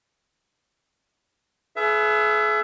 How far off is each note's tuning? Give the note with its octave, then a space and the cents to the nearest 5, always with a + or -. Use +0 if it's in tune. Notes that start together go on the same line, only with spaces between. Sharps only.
G#4 +40 B4 +0 E5 +25